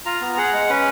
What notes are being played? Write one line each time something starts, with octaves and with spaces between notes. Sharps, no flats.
F4 A#5
B3
G#4 F#5
G#3
C#4 B4